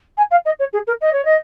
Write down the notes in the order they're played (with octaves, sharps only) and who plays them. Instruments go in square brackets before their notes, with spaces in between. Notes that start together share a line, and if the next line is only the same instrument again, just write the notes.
[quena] G#5
F5
D#5
C#5
G#4
A#4
D#5
C#5
D#5